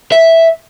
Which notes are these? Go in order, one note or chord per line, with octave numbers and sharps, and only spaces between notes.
E5